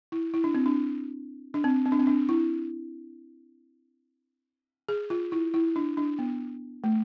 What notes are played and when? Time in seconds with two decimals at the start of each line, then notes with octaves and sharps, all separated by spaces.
0.12 E4
0.34 E4
0.44 D4
0.55 C4
0.66 D4
1.54 D4
1.64 C4
1.85 C4
1.92 D4
1.99 C4
2.07 D4
2.29 E4
4.89 G#4
5.10 F4
5.32 E4
5.54 E4
5.76 D4
5.97 D4
6.19 B3
6.84 A3